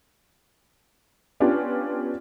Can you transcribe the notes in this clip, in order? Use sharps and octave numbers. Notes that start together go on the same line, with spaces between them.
B3 C#4 D4 F4 G4